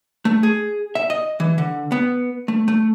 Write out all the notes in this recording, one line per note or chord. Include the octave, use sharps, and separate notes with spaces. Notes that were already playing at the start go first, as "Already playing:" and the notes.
A3
G#4
E5
D#5
E3
D3
B3
A3
A3